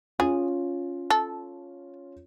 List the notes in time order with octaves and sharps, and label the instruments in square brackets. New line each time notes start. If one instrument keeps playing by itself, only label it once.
[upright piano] C#4 F4 [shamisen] G#4
[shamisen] A4